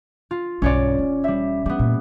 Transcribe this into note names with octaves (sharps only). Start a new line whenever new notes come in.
F4
B1 G2 C#4 C#5 D5
E1
G3 E5
G3 B3 D4
F#2 A#2